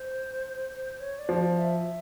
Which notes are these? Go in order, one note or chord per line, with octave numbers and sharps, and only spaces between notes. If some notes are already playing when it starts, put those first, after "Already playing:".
Already playing: C5
C#5
D5
F3
E5